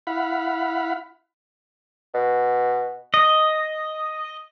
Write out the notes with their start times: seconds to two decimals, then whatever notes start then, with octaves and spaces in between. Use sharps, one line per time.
0.07 E4 F5 F#5 B5
2.14 B2
3.14 D#5